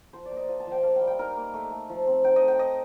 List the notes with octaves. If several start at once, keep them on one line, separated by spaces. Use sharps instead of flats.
F3 C5
D5
A#3
D#5
F3 F5
A5
F3
G5
A#3 F5
G5
G3
G5
D#4 A#4
A#3
A3
A3
F3
C4
D#4 G5
D#5
A3
G5
D#4 D#5